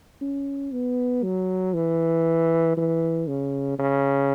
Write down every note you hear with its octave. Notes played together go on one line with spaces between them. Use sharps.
C#4
B3
F#3
E3
E3
C#3
C#3